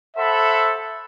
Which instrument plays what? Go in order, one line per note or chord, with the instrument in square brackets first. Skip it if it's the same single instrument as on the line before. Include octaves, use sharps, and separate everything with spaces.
[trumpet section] A4 C5 E5 F#5 B5